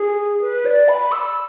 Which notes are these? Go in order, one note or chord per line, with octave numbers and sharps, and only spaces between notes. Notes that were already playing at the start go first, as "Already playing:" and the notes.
Already playing: G#4
B4
D5
B5
E6